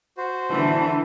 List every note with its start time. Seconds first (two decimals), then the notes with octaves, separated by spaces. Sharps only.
0.17 F#4 C5
0.51 D3 E3 A5